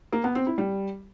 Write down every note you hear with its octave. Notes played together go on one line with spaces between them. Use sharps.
A#3
B3
C4
E4
G3